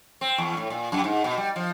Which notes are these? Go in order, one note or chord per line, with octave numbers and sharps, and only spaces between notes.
C4
E2
A2
A#2
F#2
G#2
B2
G3
F3